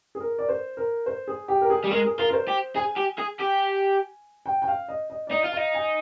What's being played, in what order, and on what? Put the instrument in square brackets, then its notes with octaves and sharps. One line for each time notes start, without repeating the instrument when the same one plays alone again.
[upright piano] G#4
A#4
D5
C5
A#4
C5
G#4
G4
A#4
G#4
[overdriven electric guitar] G3
[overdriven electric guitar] G#3 [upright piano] A#4
[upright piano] G#4
[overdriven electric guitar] F4 [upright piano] A#4
[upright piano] A#4
C5
[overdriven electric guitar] G4
[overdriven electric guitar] G#4 [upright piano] G#5
[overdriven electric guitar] G4
G#4
G4
[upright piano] G5
G5
F5
D#5
D#5
D5
[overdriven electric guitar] D#4 [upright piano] D#5
[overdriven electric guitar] F4
[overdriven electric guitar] D#4 [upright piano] F5
[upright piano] G#5